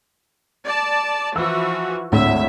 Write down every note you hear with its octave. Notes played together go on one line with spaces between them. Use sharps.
D5 A5
E3 F3 F#4 E6
G#1 D2 A2 E5